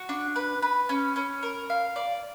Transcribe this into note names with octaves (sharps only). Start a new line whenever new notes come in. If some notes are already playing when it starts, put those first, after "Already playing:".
Already playing: F#4
D4
B4
B4
C#4
C#4
A#4
F5
D5